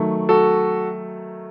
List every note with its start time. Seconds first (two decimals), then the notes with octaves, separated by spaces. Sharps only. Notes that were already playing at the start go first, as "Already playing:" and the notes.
Already playing: D#3 F#3 A3
0.29 F#4 A4